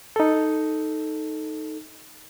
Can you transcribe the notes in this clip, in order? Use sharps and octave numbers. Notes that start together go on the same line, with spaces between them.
D#4 A4